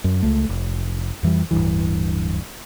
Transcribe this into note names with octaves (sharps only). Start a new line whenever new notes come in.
F#2
C#2 A3
F1
F2 E3 G3
D1 G1 G2 E3